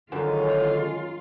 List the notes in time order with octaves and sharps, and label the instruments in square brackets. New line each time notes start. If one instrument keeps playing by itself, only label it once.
[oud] F#2 [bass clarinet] D3 [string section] D#3 G#3 C#4 [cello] F4